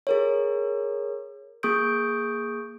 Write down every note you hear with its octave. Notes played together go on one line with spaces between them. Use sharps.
G#4 A#4 C#5
A#3 G#4 C#6 D#6 G6 D7